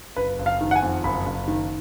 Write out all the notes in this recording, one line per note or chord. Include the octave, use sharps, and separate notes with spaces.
F#1 B4
F#1
F5
D#3
F#5
G#5
F2
F#1 B5
F#1
D#3